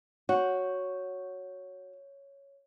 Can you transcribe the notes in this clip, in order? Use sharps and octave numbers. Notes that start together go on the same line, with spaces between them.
F#4 C#5